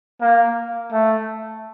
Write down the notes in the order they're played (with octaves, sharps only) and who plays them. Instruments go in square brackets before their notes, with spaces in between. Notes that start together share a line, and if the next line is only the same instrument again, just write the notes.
[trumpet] A#3
A3